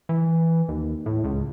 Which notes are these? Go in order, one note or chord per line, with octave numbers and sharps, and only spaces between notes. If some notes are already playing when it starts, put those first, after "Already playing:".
E3
D#2
A2
C#2